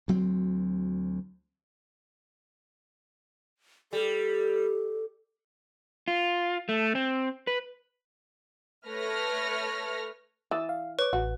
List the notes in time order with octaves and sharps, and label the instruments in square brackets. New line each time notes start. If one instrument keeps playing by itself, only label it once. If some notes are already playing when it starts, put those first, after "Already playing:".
[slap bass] D2 F#3 C4
[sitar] G3 [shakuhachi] A4
[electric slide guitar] F4
A3
C4
B4
[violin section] A3 B4 C#5 F6 A#6
[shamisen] E3 [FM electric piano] D#6 E6 A6
[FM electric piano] F5
[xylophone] B4 [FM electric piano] C#5 D6
[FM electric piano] A1 [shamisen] F#4